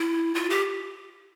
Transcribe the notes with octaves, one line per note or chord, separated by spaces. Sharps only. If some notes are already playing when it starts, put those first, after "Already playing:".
Already playing: E4
F4
G4